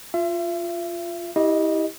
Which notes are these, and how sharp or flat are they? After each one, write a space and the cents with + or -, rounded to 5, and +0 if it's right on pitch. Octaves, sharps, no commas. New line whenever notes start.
F4 +0 E5 +40
E4 -35 G4 +0 D#5 +0